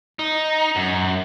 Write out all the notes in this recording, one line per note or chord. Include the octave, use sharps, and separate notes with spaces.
D#4
F#2